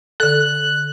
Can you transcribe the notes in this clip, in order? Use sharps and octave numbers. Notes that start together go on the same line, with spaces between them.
D3 A4 F#6